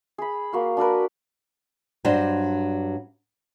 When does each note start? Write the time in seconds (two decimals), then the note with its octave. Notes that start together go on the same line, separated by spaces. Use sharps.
0.18 G#4 B5
0.53 A#3 F#4 F5
0.77 D4 F#4 A#4 B4
2.05 G2 F#3 D4 C5